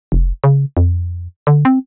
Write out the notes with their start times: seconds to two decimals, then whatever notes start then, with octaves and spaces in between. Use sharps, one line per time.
0.12 F1
0.44 C#3
0.77 F2
1.47 D3
1.65 C4